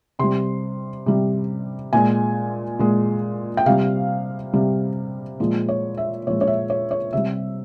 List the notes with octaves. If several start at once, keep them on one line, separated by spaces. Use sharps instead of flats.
C3 G3 C6
C3 G3
A#2 G#3 G#5
A#2 G#3
G5
C3 G3 F5
C3 G3
A#2 F3 G#3
C#5
E5
A#2 F3 G#3 C#5
C#5
E5
C#5
C#5
C3 G3 E5